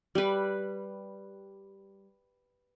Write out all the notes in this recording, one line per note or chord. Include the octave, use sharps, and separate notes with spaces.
G3 B4